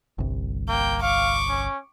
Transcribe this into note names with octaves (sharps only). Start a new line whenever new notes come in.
G1 C2
A#3 G5
F5 C#6 D6
C#4